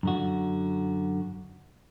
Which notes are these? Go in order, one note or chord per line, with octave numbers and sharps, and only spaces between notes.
F#2 D3 F#4